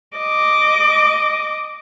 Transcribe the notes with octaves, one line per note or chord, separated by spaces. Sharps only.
D#5 D6